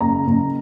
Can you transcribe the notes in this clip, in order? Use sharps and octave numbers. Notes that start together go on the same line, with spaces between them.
F#1 A#5
F#1